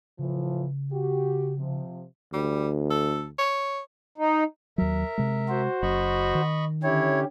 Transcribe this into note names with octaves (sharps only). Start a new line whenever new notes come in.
A2 C#3 E3 F3
F#4 G4
C3 F3
D2 G3
A4
C#5
D#4
D#2 F#3 A#4 E5
C3 G#3
F#4 C5
F#1 D#5 B5 C#6
D#3
D3 C#4 E4 G4 C#5